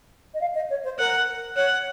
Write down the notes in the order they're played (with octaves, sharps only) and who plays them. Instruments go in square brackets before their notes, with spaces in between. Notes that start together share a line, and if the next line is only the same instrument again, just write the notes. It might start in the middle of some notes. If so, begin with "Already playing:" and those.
[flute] D#5
F5
D#5
C#5
C5
[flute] A#4 [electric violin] F#5
[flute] C#5 [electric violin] F#5